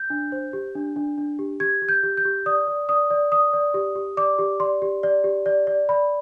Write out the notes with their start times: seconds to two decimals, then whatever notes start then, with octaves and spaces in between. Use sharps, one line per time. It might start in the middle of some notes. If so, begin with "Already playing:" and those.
Already playing: G6
0.10 D4
0.32 C5
0.53 G4
0.75 D4
0.96 D4
1.18 D4
1.39 G4
1.60 G4 G#6
1.82 G4
1.89 G6
2.03 G4
2.17 G6
2.25 G4
2.46 D5 D#6
2.67 D5
2.89 D5 D#6
3.10 D5
3.32 D5 D#6
3.53 D5
3.74 G4
3.96 G4
4.17 D5 D6
4.39 G4
4.60 D5 C6
4.82 G4
5.03 D5
5.24 G4
5.46 D5
5.67 D5
5.89 D5 B5